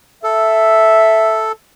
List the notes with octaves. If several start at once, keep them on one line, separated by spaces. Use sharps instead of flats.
A4 E5